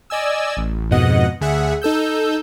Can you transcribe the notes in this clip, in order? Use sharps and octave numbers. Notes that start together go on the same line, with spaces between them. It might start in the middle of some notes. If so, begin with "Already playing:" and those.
D5 D#5 G#5 E6
A1
F2 G#2 B2 D#5 F#5
D2 G#4 E5 F#5
D#4 A4 E6 G6